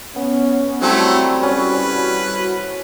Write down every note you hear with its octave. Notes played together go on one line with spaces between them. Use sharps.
B3 C#4
F#3 G3 A3 C4 E4 F#4 A4
C#4 B4